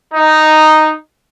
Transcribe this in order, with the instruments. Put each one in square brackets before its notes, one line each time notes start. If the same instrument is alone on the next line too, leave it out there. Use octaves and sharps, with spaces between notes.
[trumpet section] D#4